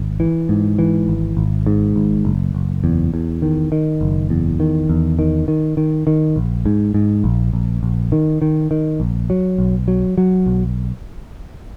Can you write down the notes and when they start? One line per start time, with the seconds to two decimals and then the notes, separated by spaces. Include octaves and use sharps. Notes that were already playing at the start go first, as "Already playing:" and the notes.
Already playing: G#1
0.20 E3
0.49 G#2
0.79 E3
1.08 G#1
1.37 G#1
1.66 G#2
1.96 G#1
2.25 F#1
2.55 F#1
2.84 E2
3.14 E2
3.42 D#3
3.72 D#3
4.01 F#1
4.30 E2
4.60 D#3
4.89 E2
5.19 D#3
5.48 D#3
5.77 D#3
6.07 D#3
6.36 A#1
6.66 G#2
6.94 G#2
7.24 A#1
7.53 A#1
7.83 A#1
8.12 D#3
8.42 D#3
8.71 D#3
9.00 A#1
9.30 F#3
9.58 B1
9.88 F#3
10.18 F#3
10.46 B1